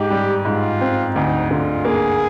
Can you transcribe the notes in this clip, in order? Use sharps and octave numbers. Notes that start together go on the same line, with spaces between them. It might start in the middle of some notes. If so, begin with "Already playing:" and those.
Already playing: G#2 G4
G3
G#2 F4
C4
D2 D#4
D3 F4
A#3 G#4